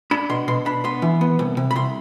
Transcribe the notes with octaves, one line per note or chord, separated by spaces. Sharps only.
D4 B5
B2 C6
B2 C6
D4 B5
B3 C6
E3
B3
C2
C3
B5
C2 C6